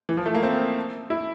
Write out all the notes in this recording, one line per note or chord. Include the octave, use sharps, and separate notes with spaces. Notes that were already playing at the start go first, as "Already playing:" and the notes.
E3
F3
A3
A#3
C4
E4